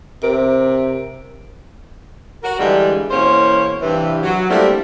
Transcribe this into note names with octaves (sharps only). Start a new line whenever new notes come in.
C3 A#4 D7
F#4 A#4
G2 D3 E3 G3 G#3
E2 B2 A#3 C#4 C5 C#5
G2 C3 E3
F#3
G3 A3 A#3 C4 D4 E4